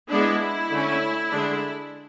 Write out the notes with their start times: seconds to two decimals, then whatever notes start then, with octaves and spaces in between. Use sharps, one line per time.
0.11 G#3 B3 D4 E4
0.71 D3 A3 C#4
1.30 D3 G#3 D4